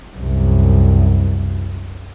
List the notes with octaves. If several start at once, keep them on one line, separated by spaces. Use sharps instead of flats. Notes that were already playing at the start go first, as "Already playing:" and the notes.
C2 F#2